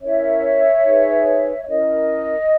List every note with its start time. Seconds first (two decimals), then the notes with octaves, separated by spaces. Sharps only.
0.01 C#4 E4 A#4 C#5 E5
0.84 D#4 G#4 B4
1.63 E5
1.67 C#4 E4 A#4 D#5